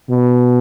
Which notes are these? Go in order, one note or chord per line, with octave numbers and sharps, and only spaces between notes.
B2